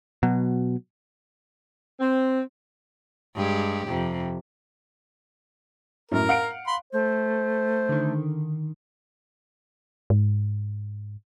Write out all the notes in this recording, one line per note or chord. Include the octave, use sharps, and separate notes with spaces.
B2 F#3
C4
G2 G#3 G4
F2 C3
F#2 A2 A#4
F5 F#5 D7
B5 C6
A3 C5
D3 D#3
G#2